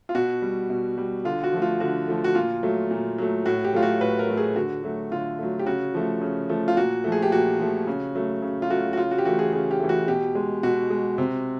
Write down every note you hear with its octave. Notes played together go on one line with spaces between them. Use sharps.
F4
B2 F#4
G3
B2
G3
D3 F4
F#4
F3 A3
F4
D3 F#4
F3 A3
F#4
A#2 F4
F#3 A3
A#2
F#3 A3
A2 F#4
G4
F#3 A3 F4
F#4
A2 B4
A#4
F#3 A3
G#4
D3 F#4
F#3 A3
D3 F4
F#3 A3
G4
C#3 F#4
F3 A3
C#3
F3 A3
F4
A#2 F#4
F3 A3
G#4
G4
A#2 F#4
F3 A3
C#3
F#3 A3
C#3
F4
F#3 A3 F#4
F#4
C#3 F4
F#4
G4
E3 A3 F#4
G#4
C#3 G#4
G4
E3 A3
F#4
B2 G4
G#3
B2 F#4
G#3
C3